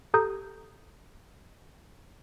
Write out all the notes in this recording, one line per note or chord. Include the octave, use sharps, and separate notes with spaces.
G4 A4 A#5 D#6 G6